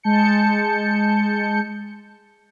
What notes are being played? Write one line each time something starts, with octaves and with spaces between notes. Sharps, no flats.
G#3 A5 G6 C#7